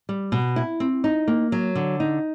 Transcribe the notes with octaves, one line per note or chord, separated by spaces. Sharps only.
G3
B2
E4
C4
D#4
A#3
F#3
D3
D#4